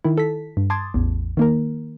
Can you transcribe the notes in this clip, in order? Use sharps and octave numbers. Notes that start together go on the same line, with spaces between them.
D#3 E4
A4 B6
G2
A5 C6 D6 D#6 G#6 A6
A1 E2
D#3 A#3 A#4